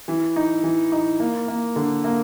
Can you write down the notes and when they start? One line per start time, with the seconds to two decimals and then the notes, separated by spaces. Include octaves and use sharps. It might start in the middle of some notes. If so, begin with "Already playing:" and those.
0.08 E3
0.36 D#4
0.64 E3
0.92 D#4
1.20 A#3
1.48 A#3
1.76 D3
2.04 A#3